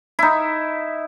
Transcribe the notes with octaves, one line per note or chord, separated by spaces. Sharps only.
D#4 E4